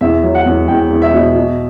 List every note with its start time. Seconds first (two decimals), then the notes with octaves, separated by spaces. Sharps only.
0.01 E2 E5
0.23 F#3
0.35 F#5
0.46 E2
0.68 E2 G5
0.90 E2
1.02 E5
1.13 B2
1.35 B2